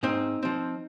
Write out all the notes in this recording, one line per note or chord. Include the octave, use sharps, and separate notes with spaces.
G#2 C4 D#4
F3 C4